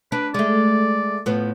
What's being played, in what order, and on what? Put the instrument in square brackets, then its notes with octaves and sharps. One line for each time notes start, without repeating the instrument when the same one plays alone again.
[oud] D4 [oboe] B4
[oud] G#3 A3 [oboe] D5
[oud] A2 F3 B3